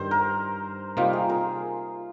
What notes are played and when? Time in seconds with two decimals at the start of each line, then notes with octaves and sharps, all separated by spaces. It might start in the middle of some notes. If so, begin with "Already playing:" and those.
Already playing: G2 D#3 G3 C5
0.11 A#4
0.97 C3 G3 A#3 D#4 F4
1.13 G#4
1.29 A#4